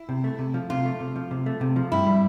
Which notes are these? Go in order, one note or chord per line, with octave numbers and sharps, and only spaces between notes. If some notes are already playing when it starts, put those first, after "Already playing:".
Already playing: E4
C3
A3
C3
F3
C3 F4
A3
C3
F3
C3
A3
C3
F3
G2 E4
G3